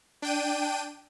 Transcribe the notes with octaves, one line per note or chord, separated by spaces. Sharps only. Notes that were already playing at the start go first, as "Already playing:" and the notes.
D4 G5 D#7